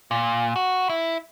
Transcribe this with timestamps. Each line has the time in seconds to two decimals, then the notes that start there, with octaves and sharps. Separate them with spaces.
0.11 A#2
0.56 F#4
0.89 E4